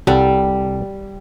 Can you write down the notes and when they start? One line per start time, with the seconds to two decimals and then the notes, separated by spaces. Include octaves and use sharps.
0.07 C2 G3 A4 F#5